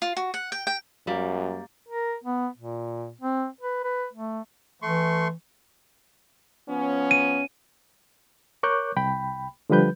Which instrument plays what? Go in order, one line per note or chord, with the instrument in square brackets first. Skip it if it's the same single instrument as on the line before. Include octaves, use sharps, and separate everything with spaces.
[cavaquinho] F4
F#4
F#5
G5
G5
[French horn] F#2 [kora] G3 A#3
[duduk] A#4
B3
A#2
C4
B4
B4
A3
[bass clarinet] E3 [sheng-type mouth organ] A3 C6 C#6
[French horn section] F3 B3 C#4
[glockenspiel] D#7
[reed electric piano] A#4 C#5 C#6 D6 F#6 G6
C2 G5 B5
D3 F3 G3 B4 G6